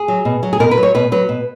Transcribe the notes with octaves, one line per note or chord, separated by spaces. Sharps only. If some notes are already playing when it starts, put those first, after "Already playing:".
Already playing: G#4
F#3
B2
F#3
G#4
B2 A#4
B4
F#3
C#5
B2 B4
F#3 B4
B2